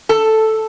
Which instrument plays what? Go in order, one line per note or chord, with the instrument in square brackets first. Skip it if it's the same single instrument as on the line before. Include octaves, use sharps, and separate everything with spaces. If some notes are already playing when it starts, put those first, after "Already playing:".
[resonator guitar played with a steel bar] A4